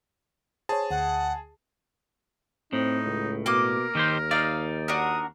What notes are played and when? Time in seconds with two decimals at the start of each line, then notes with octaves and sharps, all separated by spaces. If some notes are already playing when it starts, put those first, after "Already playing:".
0.69 G#4 C5 C#5 A5
0.91 D2 F#5
2.73 A2 C4 D#4
3.05 C#2
3.46 B2 A#3 A#4 D6 D#6
3.95 D#2 D#3 G4 C5
4.31 D#4 D5 F5
4.88 D4 F#4 A#4 D#6